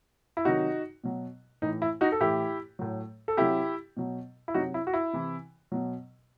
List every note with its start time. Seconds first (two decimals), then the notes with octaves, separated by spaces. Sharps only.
0.37 E4
0.45 C3 D#3 F#3 D#4 F#4
1.04 B2 F#3
1.62 A2 E3 D#4
1.82 E4
2.01 D#4 F#4
2.12 A4
2.20 A2 E3 E4 G4
2.79 A2 F#3
3.28 A4
3.37 C3 F#3 E4 G4
3.97 B2 F#3
4.48 E4
4.54 C3 F#3 D#4 F#4
4.74 E4
4.87 F#4
4.93 E4
5.13 C3 E3
5.72 B2 F#3